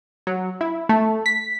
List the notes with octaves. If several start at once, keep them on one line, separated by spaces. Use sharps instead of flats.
F#3
E4
A3
B6